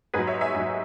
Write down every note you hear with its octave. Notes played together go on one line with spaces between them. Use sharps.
G#2 F#3 G#4 B4
C#5 E5
E5 G#5
G#2 F#3